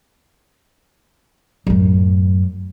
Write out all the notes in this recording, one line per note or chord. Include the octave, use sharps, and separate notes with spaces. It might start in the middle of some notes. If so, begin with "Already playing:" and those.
F#2 A2